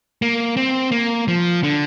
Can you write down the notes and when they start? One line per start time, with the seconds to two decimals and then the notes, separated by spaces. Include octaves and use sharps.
0.22 A#3
0.57 C4
0.92 A#3
1.28 F3
1.63 D3